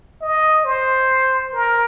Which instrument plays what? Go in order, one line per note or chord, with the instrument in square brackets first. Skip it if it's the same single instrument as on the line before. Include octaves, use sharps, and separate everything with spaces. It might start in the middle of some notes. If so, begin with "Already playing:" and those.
[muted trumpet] D#5
C5
A#4